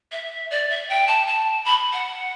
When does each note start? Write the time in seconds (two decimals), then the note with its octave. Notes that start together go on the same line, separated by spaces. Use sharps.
0.12 E5
0.51 D5
0.70 E5
0.89 G5
1.07 A5
1.27 A5
1.65 B5
1.93 F#5